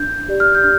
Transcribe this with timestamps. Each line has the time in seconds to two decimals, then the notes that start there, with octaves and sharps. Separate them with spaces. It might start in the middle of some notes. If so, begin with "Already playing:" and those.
Already playing: D4 G6
0.29 G4 D5
0.40 F6
0.55 G6
0.63 D4 F6